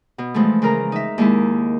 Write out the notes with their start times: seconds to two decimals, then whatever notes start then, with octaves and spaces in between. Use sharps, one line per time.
0.18 B2
0.34 E3 F3 G#3 A3
0.62 C#3 A#4 A#5
0.92 D#4 E5
1.18 D#2 G#3 E4